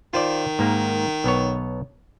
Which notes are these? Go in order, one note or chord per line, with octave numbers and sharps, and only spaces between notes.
D#3 F4 C5 D5
G#2 A#3
B1 B3 C#5